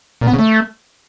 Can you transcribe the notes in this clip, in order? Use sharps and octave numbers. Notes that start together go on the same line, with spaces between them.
A#2
B3
C#3
A3